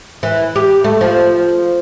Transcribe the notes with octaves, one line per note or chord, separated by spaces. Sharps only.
E3
G4
A3
F3